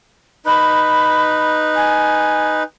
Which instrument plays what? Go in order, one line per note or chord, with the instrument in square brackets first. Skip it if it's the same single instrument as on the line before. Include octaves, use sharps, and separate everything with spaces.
[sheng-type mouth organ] D#4 B4 [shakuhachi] B5
[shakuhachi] G#5